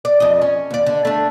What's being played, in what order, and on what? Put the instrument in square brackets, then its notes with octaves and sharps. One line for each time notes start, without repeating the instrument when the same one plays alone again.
[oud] D5
F2 D#5
C#4
D#2 D5
D3
A3 D4